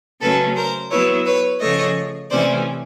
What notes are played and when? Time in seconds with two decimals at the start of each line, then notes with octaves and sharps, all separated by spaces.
0.21 C#3 F#3 A3 C#4 A4 B4
0.56 A#4 C5
0.90 F#3 B3 E4 B4 C#5
1.26 B4 C#5
1.60 C#3 F3 A3 C#5 D#5
2.30 C3 E3 A3 C#4 C5 D5